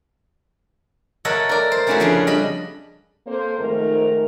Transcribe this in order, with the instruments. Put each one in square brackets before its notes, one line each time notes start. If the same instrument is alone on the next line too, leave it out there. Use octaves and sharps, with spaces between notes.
[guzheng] A4 A#4 C#5 D#5 E5 F#5
A#4 D5
C5
A3 C4 C#4 E4 F#4 G#4
F2 C#3 D4
G3 D4 D#5 B5
[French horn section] A#3 C4 A4 C5
F2 G#2 D#3 A3 A#4